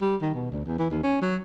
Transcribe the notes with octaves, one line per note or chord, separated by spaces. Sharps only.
G3
D#3
B2
D2
E2
E3
D#2
C#4
F#3